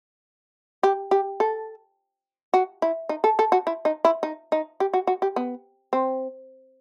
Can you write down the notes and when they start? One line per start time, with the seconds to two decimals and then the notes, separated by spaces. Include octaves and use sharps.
0.83 G4
1.11 G4
1.40 A4
2.54 F#4
2.82 E4
3.09 D#4
3.24 A4
3.39 A4
3.52 F#4
3.67 E4
3.85 D#4
4.05 E4
4.23 D#4
4.52 D#4
4.80 G4
4.94 F#4
5.07 F#4
5.22 G4
5.36 B3
5.93 C4